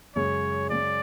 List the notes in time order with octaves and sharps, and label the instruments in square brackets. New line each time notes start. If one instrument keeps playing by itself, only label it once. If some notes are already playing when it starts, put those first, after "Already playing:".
[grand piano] F#2 C#3 G#3 C#4 [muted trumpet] C#5
[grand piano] F#2 C#3 G#3 C#4 [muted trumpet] D5